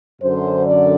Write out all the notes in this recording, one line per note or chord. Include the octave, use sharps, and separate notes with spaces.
F#2 D3 C5
D5